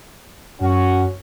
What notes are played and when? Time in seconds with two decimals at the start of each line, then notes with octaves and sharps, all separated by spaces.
0.60 F#2 C#4 F#4